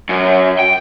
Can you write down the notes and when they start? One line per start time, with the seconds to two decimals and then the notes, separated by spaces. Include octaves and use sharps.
0.09 F#2
0.59 G5